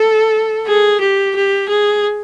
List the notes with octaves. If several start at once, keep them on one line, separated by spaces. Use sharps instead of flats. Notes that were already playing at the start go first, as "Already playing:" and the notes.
Already playing: A4
G#4
G4
G4
G#4